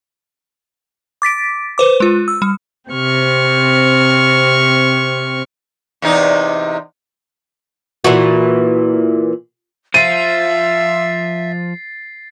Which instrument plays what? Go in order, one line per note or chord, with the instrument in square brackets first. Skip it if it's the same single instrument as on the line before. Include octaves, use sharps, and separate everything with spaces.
[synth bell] D6 A6 B6 D7
B4 C5 D6
G#3 F4
E6
G3
[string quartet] C3 C4 C#6 F6
[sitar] E2 C3 D#4
[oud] A#2 E3 F#4
[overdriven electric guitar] F3 F4 [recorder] E5 [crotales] A6 C7 [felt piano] D#7